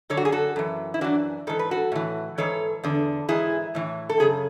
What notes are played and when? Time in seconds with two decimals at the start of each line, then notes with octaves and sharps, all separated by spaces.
0.10 F#2 D3 A4 C#5
0.17 F#4
0.25 G#4
0.32 F#4 A4
0.56 F#2 E3
0.94 E4
1.01 F#2 E3 D4 F#4
1.47 G#2 E3 A4
1.59 B4
1.71 F#4 A4
1.92 A2 E3
2.38 G#2 E3 A4 C#5
2.84 E2 D3
3.29 G#2 E3 E4 G#4
3.75 A2 E3
4.09 A4
4.20 F#2 C#3 G#4